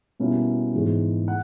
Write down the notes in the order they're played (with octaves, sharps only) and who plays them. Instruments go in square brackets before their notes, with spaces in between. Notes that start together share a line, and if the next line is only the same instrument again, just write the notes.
[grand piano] B2 G3 A#3 C#4 E4
G#2 E3 G#3 B3
F#5